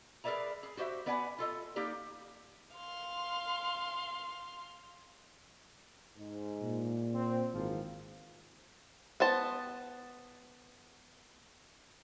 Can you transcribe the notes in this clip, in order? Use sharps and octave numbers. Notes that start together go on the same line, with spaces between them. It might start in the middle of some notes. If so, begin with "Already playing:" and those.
G#4 A#4 B4 D5 E5 A#5
G#4
F#4 G4 C5 D#5 E5
B3 B4 D5 F#5 G#5
F4 A4 D#5
A#3 D#4 G4 D5
F5 C6
G#2
A#2
C4
G#1 E3 F3 A#3
B3 C5 A5